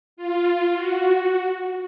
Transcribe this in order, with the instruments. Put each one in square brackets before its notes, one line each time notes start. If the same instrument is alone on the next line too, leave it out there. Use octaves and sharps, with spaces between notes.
[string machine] F4
F#4
F#4